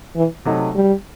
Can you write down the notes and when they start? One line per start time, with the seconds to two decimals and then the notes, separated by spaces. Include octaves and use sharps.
0.16 E3
0.45 C3 F#3 A3 D#4
0.75 G3